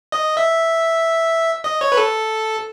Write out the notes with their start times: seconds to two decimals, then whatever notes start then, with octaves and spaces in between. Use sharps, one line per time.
0.12 D#5
0.37 E5
1.64 D#5
1.81 C#5
1.92 B4
1.97 A4